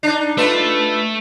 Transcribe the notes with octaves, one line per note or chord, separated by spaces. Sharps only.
D4 D#4
A3 D4 F4 B4